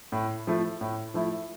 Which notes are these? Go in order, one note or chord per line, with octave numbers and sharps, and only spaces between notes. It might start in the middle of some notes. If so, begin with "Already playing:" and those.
A2
F3 A3 E4
A2
F3 A3 E4